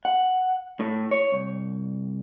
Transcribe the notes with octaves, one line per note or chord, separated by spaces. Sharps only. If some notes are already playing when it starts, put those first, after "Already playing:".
F#5
A2
C#5
C2